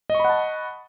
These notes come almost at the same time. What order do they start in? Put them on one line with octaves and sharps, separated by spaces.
D#5 C#6 B5 F#5 A5